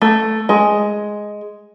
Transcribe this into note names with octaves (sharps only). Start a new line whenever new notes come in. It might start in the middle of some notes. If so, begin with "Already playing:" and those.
A3
G#3